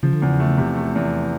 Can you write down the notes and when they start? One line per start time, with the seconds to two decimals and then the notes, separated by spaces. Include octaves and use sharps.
0.03 C#3 F3
0.13 D3
0.22 E2 C#3
0.40 A3
0.58 C3
0.76 A3
0.95 E2